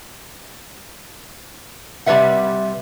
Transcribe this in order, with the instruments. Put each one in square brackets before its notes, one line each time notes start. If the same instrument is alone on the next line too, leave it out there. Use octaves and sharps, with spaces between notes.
[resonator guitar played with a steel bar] C3 G3 A3 B4 E5 F#5